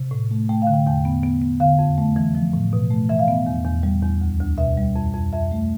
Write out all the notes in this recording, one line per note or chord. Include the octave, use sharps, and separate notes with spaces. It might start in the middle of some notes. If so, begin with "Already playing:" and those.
Already playing: C3
A2
A3
A3 G5
F5
D3
G5
E2 G5
B3
B3
B3
D3 F5
F2
A3
E3
F3
A2
B2
A3
E3 E5
F5
B3 E5
E2
E2
G3
E2
D2
D2
B2 E5
G3
F2
F2
F2 E5
A3